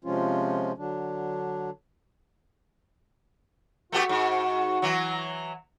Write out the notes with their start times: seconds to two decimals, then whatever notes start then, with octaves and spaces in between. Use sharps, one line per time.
0.05 C3 F3 G#3 C#4 F4
0.78 D3 F#3 D4
3.92 A3 B3 F#4 G4
4.09 G#2
4.82 E3 F#3